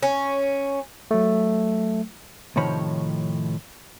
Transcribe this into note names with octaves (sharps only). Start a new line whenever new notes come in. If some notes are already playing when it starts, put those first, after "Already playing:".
C#4
F#3 A3
A2 C3 D#3 F3 C#5 B5